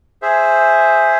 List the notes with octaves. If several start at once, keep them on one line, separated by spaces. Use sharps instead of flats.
G#4 C5 E5